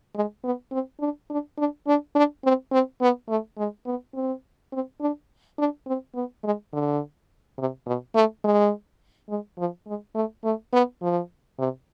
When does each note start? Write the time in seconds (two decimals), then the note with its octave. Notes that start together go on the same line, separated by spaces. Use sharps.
0.15 G#3
0.44 B3
0.71 C4
1.00 D4
1.30 D4
1.58 D4
1.87 D4
2.15 D4
2.44 C4
2.72 C4
3.01 B3
3.29 A3
3.58 G#3
3.86 B3
4.14 C4
4.72 C4
5.01 D4
5.58 D4
5.87 C4
6.15 B3
6.44 G#3
6.73 D3
7.58 C3
7.86 B2
8.15 A3
8.44 G#3
9.29 G#3
9.58 F3
9.87 G#3
10.15 A3
10.44 A3
10.73 B3
11.02 F3
11.59 C3